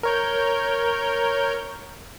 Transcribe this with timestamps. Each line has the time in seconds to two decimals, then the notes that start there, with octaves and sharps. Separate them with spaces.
0.03 A#4 C#5 G6